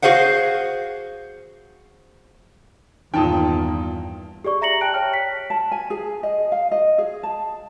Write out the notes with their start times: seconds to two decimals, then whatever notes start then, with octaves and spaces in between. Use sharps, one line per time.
0.02 F#4 G#4 C5 F5 F#5
3.14 E2 G2 A#2 D#3 G5 A5 D#6
4.45 G4 G#4 D5 C#6
4.61 E5 A#5 A#6 C#7 F#7
4.81 G5 A5 F#6 D7
4.94 C#5 G5 F6
5.14 B6
5.50 A5
5.72 G#5
5.90 G#4
6.23 D#5
6.52 F5
6.71 D#5
6.98 G#4
7.23 A5